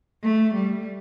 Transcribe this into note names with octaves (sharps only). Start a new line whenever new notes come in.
A3
G3